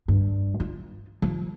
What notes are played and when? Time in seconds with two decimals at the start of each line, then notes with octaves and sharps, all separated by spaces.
0.08 G2
0.60 F4
1.22 F3